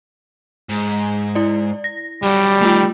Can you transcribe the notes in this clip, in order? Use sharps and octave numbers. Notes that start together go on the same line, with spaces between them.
G#2
E4 D5
A#6
F#3 G3 D4
D#3 A3 F4